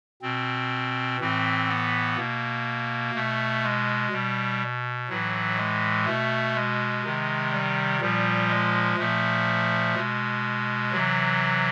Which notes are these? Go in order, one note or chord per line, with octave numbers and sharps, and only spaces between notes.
B2 C4
A2 E3 C4
B3
B2 A#3
B2 A3
G#3
B2 G3
A2 E3 F#3
G#3
B2 A3
G#3
C3 D#3
G3
A#2 F3 G3
G#3
A#2 F3 A3
B2 G#3
C3 E3 F#3